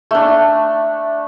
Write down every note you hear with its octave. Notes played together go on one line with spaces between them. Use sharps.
A3 D4